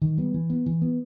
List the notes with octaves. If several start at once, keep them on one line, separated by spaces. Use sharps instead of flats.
D#3
G3 B3
E3
B3
E3
B3